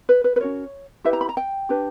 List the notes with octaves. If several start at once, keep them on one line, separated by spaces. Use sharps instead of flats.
B4
B4
B4
C#4 F#4 A#4 C#5
E4 G4 B4 E5
A#5
B5
A#5
G5
D4 G4 B4